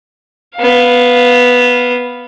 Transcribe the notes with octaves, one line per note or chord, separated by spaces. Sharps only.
B3 F5